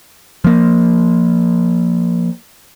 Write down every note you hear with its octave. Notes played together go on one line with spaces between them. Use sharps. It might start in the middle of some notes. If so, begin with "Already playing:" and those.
F3 A#3